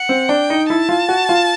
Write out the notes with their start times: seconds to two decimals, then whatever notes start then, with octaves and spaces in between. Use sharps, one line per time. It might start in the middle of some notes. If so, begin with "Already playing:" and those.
Already playing: F#5
0.09 C4
0.29 D4 G5
0.50 D#4
0.69 E4 A5
0.89 F4
1.09 F#4
1.29 F4